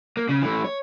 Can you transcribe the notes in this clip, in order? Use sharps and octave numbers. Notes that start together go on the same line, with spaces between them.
A#3
C#3
E3 A3
C#5